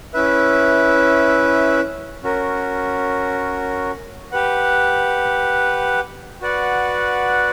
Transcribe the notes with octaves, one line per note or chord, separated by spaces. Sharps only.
C#4 E4 B4 E5
C#4 F#4 A#4
G4 B4 F#5
F#4 B4 D5 F#5